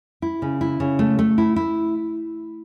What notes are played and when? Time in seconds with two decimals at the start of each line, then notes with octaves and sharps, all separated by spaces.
0.22 E4
0.42 C#3
0.61 E4
0.80 C#3
0.99 A3
1.19 A3
1.38 E4
1.56 E4